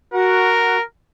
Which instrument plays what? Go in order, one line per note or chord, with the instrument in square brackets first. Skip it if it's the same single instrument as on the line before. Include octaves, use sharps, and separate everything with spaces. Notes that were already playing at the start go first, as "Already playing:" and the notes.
[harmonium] F#4 F#5 [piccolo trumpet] A#4